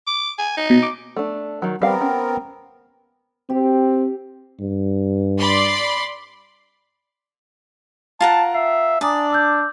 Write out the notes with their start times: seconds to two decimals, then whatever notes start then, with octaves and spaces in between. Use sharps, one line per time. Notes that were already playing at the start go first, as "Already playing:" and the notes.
0.07 D6
0.38 G#5
0.57 D#4
0.70 B2
0.83 D6
1.16 A3 D4
1.62 D#3 F#3
1.82 G3 B3 C4 A#4 F5
2.01 C#4
3.50 C4 G4
4.60 G2
5.39 D5 B5 C6
8.21 F4 A#4 F#5 A5
8.54 E5 C7
9.01 D4 D5 G#5 A#5 D#6
9.30 D6 E6 G6